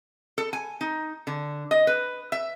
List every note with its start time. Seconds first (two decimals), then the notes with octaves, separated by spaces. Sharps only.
0.38 A4
0.53 G#5
0.81 D#4
1.27 D3
1.71 D#5
1.87 B4
2.32 E5